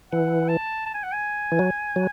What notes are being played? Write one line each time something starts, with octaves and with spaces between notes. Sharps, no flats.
E3 F#5
A5
A5
G#5
F#5
G#5
E3
F#3
F#3